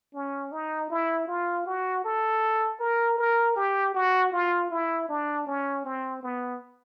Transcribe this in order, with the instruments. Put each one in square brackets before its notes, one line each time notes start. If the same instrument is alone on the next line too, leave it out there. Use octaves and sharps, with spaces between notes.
[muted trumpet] C#4
D#4
E4
F4
F#4
A4
A#4
A#4
G4
F#4
F4
E4
D4
C#4
C4
B3